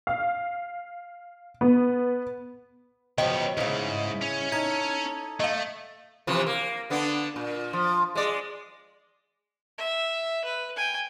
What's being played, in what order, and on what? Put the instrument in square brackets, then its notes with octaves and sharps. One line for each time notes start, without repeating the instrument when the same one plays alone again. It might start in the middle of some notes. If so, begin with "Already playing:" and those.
[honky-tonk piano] F5
B3
[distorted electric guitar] C#2 B3 [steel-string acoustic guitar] B2 F3 G5 [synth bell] D#5
[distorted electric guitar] D#2 G#2 [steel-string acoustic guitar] C#3 E4
[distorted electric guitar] C#4
[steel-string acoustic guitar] D#4 A4 [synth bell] G#6
[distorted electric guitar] A3 [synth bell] D#5 F5
[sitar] C3 E3 F3
A#3
D3 B3 D4
A#2
F3
G#3 D5
[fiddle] E5
B4
G5 G#5